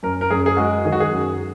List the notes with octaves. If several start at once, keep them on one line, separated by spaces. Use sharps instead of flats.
F#2 A#4
A#4
F#2 G#4
G#4
G#3 F#4
D#3 G#4
F#4
G#4
F#2